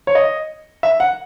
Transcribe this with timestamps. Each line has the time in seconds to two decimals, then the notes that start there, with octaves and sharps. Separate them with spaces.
0.07 C#5
0.15 D#5
0.83 E5
1.00 F#5